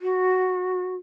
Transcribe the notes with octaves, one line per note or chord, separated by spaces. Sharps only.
F#4